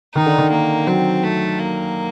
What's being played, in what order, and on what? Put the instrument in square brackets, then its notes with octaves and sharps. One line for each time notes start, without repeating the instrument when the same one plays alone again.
[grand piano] D#3 [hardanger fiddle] D#4
[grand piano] D3
D#3
[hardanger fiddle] A#3
[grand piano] F#3 [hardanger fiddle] C4
[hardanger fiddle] A3
A#3